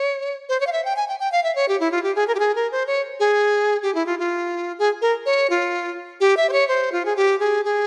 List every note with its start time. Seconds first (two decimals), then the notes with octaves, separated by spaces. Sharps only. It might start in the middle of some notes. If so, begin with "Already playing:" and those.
Already playing: C#5
0.49 C5
0.60 C#5
0.67 F5
0.73 E5
0.85 G5
0.97 G#5
1.08 G5
1.20 G5
1.32 F5
1.44 E5
1.56 C#5
1.69 G4
1.80 E4
1.92 F4
2.03 G4
2.16 G#4
2.28 A#4
2.35 G4
2.40 G#4
2.55 A#4
2.72 C5
2.87 C#5
3.20 G#4
3.83 G4
3.95 E4
4.06 F4
4.19 F4
4.79 G#4
5.02 A#4
5.26 C#5
5.50 F4
6.21 G4
6.37 E5
6.49 C5
6.53 C#5
6.68 C5
6.92 F4
7.05 G#4
7.16 G4
7.40 G#4
7.65 G#4